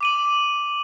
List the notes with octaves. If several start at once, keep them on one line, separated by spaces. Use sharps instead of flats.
D6 D#7 F#7